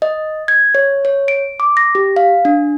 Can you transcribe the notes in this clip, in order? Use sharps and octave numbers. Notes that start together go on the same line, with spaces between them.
D#5
G#6
C#5
C#5
D7
D6
A#6
G4
F5
D4